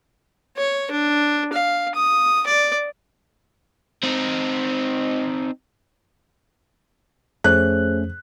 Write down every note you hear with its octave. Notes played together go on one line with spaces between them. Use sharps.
C#5
D4
F5
D#6
D5
C4 D#4
F2 A3 C#4 G#4 C5 F#6